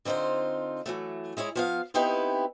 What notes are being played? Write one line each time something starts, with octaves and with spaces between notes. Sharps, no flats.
D3 C4 D#4 F4 C5
E3 F#3 A3
G#3 E4 G#4 C#5
F3 B3 F5
B3 C4 D#4 E4 G4 B4